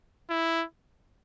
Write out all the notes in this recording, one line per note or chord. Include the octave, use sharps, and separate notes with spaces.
E4